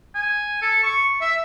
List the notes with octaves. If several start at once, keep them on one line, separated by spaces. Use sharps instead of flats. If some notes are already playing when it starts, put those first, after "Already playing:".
G#5
A4
C#6
E5